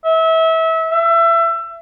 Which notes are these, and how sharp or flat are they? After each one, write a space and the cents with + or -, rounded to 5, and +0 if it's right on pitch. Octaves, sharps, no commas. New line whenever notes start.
E5 -25
E5 +25